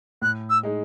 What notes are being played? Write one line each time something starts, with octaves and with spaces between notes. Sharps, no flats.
A2 F#6
E6
G#3 D#4 G#4